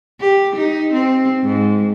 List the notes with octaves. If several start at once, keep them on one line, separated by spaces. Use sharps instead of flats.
G4
D#4
C4
G#2